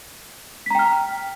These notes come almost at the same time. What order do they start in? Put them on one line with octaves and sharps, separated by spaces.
B6 A#5 G5 F6